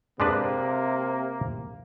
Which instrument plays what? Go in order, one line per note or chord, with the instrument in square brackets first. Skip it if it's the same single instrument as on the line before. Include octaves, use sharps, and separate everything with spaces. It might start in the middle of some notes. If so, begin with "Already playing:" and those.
[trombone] C3 [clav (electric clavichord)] G#3 D4 B4 [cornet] A#3